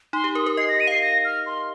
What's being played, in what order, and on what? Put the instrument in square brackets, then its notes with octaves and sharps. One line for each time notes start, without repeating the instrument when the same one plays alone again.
[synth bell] D#4 [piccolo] C6
[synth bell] G4
[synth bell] A#4 [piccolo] D#6
[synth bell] A#4
[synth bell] D#5 [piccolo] C7
[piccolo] A#6
D#7
[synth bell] F5 [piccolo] C7
[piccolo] A#6
F6
C6